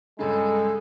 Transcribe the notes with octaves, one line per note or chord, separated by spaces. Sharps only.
C#2 G2 C#3 G#3 A4